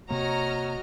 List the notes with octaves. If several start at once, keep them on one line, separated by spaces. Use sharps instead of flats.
C3 A#3 F#4 C#5 D#5 A#5 F6